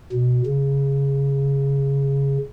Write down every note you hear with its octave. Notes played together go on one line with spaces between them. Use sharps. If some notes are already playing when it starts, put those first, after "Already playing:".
B2
C#3